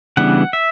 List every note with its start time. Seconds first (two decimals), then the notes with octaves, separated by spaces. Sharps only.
0.17 C#3 E3 G3 B3 D4 F#5
0.53 E5